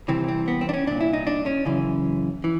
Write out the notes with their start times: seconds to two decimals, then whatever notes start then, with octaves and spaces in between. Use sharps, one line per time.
0.08 C2 C3 E3 C4
0.28 C4
0.48 B3
0.61 C4
0.69 D4
0.74 C#4
0.87 C2 A#2 D4
1.01 E4
1.13 D#4
1.27 D4
1.46 C#4
1.65 F#2 C#3 E3
2.44 E3